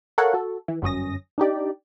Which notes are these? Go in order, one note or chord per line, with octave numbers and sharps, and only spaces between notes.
A4 A#4 C#5 F5 F#5
F#4 A4
E3
G1 F#2 C#4 D#6 A#6
D4 D#4 G4 D5